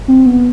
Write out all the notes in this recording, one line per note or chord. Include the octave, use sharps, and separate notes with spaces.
C4
B3